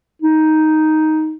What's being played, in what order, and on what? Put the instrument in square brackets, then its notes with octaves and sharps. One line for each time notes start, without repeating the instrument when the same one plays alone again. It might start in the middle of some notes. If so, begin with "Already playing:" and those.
[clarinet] D#4